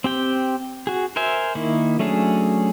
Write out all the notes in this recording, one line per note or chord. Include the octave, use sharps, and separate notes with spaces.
C4 G4 G5
F#4 G#4
A#4 C5 E5 G#5
D#3 A#3 E4
F#3 A3 C#4 D4 G#4